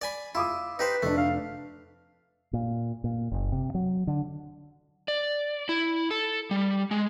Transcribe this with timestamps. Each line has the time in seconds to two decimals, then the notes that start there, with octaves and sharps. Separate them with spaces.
0.02 D5 G#5 B5
0.35 E4 F4 D6 D#6
0.79 D#4 G4 B4 C5
1.02 F1 A3 D4
1.18 F5
2.53 A#2
3.04 A#2
3.31 F#1
3.52 C3
3.74 F#3
4.07 D3
5.08 D5
5.69 E4
6.11 A4
6.51 G3
6.91 G#3